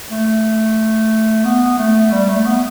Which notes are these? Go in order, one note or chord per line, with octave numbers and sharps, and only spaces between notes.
A3
B3
A3
G3
A3
B3